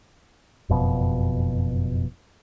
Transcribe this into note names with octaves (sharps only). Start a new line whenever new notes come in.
F#1 F2 B2